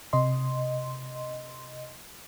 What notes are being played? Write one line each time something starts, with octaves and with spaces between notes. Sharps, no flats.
C3 D#5 C6